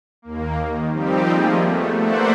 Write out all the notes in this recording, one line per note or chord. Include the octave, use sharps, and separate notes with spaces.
D#2 A#3
D#3
F3 G3 C4 D#4 G4
F3 A3 A#3 G#4
A3 B3
A3 A#3 C5 D5 E5 F#5